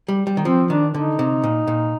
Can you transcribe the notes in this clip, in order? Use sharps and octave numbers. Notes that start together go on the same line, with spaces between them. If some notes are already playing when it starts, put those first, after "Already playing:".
G3
G3
D#3
F3 C4
D#3 D4
D3 D#4
C3
A#2
A#2